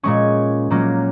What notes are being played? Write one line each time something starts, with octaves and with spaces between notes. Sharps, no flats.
A#2 G#3 C#4 C#6
A#2 F#3 A#3 C#4